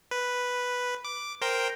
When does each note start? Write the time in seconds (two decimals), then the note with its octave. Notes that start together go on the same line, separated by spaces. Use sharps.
0.11 B4
1.05 D6
1.41 A#4 C5 G5